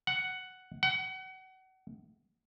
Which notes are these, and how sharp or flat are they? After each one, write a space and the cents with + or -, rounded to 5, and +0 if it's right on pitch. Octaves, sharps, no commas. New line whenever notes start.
F#5 +5
F#5 +30